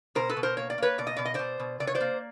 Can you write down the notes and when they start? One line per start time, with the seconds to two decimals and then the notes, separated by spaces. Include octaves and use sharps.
0.15 B2 A#4 C5
0.29 A4 B4
0.37 B2
0.43 A#4 C5
0.57 A#3 C#5
0.70 D5
0.78 A#3 B4 C#5
0.98 B2 D5
1.07 D#5
1.16 B2 D5
1.25 D#5
1.34 B2 C5 D5
1.60 B2
1.80 C3 D5
1.87 C#5
1.95 C5 D5
2.00 A#3